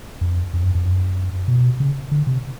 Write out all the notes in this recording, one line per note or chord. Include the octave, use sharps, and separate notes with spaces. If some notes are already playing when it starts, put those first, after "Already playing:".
F2
F2
F#2
F2
F#2
B2
C#3
D3
C3